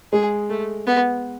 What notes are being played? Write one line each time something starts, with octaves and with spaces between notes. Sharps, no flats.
G#3 G#4
A3
B3